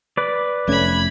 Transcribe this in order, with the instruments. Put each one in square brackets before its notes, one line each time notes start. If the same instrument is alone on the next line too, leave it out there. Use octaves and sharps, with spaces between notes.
[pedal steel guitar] B4 D5
[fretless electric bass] F1 A3 C#4 [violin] B5 G#6